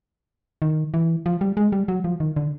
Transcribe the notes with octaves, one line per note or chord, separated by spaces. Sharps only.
D#3
E3
F3
G3
G#3
G3
F#3
F3
D#3
D3